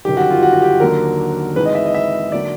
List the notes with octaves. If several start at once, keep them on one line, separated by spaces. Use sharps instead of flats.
G1 F#2 D#3 G4
F#4
F4
F#4
F#4
G4
D#2 D3 F#3 A#3 A#4
G#1 G#2 E3 B4
D#5
E5
D#5
E5
D3 F#3 A#3 D5